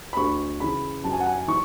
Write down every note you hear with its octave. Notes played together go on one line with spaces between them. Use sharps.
B5
D2 C#6
C#3 E3 B5
F#2 A5
G#5
F#5
G#5
E3 C#6